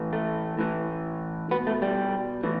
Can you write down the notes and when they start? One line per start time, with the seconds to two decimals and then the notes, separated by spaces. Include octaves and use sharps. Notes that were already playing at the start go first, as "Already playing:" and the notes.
Already playing: A2 E3
0.13 A3
0.59 A2 E3
1.51 B2 B3
1.67 A3
1.82 G3
2.44 A2 E3